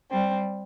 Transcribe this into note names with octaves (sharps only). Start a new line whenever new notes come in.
G3 C4